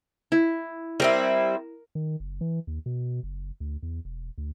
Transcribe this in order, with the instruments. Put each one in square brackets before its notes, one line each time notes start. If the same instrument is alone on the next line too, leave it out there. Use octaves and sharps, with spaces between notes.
[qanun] E4
[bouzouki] G3 C4 E4 [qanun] A#4
[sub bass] D#3
F#1
E3
D#2
B2
F#1
D2
E2
E1
D2